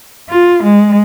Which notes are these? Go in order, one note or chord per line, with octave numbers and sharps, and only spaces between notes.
F4
G#3